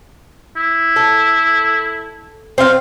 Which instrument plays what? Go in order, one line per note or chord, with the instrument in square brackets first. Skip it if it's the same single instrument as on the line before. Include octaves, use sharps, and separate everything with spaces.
[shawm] E4
[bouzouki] A4
C4 F5